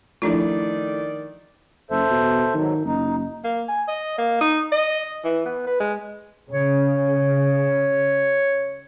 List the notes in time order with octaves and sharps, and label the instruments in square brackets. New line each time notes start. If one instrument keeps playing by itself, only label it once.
[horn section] D#3 D5 [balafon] F3 D4 F4 [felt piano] A3 E4
[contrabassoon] F#1 [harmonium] A4 C5 E5
[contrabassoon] B2
[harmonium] G#2 F#3 [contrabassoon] D#3
[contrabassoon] F#1 [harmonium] D#4
[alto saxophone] A#3
G#5
D#5
A#3
D#4
D#5
E3
B3
B4
G#3
[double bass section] C#3 [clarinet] C#5